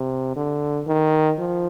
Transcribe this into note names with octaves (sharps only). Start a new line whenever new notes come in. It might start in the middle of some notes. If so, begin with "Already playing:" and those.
Already playing: C3
D3
D#3
F3